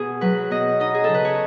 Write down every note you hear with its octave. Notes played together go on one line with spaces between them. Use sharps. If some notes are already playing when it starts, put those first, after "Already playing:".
Already playing: B2 G#4
F#3 B4
B2 D#5
D#4 D#5
G#4
A4
C#3
B4
C#5